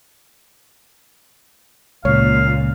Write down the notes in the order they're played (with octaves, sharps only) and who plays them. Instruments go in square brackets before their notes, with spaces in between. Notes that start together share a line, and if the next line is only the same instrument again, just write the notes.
[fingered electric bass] C#2 [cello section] A#2 [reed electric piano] C#5 [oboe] F5